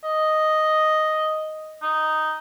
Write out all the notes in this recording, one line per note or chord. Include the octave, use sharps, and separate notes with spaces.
D#5
D#4